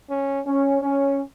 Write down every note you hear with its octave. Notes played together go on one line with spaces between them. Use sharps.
C#4
C#4
C#4